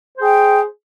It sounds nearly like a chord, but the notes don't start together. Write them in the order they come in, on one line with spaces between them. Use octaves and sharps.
C5 G#4 G5